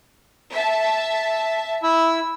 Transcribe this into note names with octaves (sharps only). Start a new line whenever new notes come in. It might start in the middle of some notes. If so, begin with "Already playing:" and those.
E5 A5
E4 E6